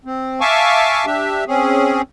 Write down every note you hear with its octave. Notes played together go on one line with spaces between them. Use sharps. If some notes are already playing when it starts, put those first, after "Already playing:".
C4
E5 F5 G#5 A5 C#6 D6
D4 G4 E5
C4 C#4 G#4